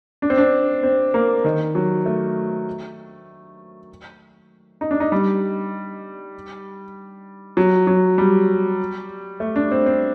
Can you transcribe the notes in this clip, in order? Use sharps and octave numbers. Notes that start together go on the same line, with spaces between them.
D4
C4
D4
C4
A#3
D#3
F#3
A3
D#4
D4
D#4
G3
F#3
F#3
G3
A3
D4
C4
C4